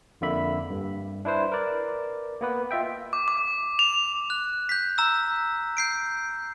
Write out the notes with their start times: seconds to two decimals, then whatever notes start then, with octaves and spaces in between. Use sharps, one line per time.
0.21 F2 D3 A#3 E5 B5
0.70 G2
1.25 D4 E4 B4 C5
1.52 A#4 B4 D5
2.41 A#3 B3 B4
2.71 F4 D#5 E5 G5
3.13 D6
3.28 D6
3.79 F7
4.30 F#6
4.69 G6 B6
4.98 A#5 E6
5.77 G6 C7 D7